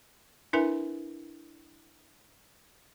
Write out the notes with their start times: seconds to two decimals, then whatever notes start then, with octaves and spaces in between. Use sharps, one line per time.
0.53 D4 E4 A#4 B4 E5 G#5